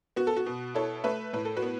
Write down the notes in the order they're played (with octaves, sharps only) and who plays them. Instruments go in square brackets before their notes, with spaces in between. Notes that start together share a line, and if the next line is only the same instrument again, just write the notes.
[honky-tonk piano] B3 F#4
A4
F#4
B2
E4 A4 C#5
A3 B4 E5
A2 B4
A4
F#4 B4
B3